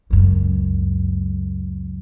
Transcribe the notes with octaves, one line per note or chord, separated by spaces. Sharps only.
C#2 F#2